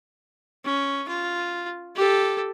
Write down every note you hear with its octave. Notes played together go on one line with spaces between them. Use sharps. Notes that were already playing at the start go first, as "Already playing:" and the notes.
C#4
F4
G4 A4